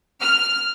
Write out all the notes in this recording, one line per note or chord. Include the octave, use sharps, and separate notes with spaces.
F6